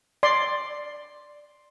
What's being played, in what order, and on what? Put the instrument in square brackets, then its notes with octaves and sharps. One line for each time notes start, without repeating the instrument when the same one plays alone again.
[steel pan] D5 C6